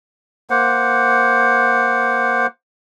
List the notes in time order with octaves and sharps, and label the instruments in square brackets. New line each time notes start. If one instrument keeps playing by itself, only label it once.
[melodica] A#3 C5 F#5